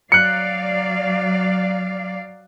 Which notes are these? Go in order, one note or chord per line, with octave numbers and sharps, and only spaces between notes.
F#3 D5 F5 F#6 C#7